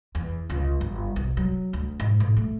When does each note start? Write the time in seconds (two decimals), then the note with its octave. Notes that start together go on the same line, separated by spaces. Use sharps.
0.15 E2
0.50 C#2
0.81 G1
1.16 B1
1.37 F#3
1.73 D2
2.00 G#2
2.20 A2
2.37 A3